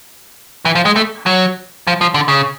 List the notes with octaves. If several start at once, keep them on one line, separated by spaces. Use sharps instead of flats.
E3
F3
G#3
A3
F#3
F3
F3
D3
C#3